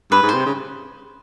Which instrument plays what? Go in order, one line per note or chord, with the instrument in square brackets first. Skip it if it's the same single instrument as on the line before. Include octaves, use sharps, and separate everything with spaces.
[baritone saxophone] G2 [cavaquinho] B4
[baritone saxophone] G#2
[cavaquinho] C5
[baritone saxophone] C3
C#3